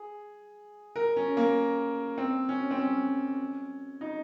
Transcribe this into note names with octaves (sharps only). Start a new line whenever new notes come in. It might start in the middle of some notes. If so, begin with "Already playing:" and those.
Already playing: G#4
A#4
C#4
A#3
C4
C#4
C4
C#4
D#4